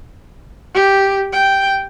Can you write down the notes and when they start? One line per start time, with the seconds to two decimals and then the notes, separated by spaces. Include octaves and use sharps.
0.74 G4
1.33 G5